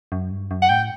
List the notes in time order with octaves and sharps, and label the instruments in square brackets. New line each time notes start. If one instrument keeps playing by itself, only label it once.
[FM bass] F#2
G2
F#2
[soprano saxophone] F#5
[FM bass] A2 [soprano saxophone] G5